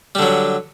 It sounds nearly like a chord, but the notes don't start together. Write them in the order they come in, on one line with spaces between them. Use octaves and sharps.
G3 D3 F#3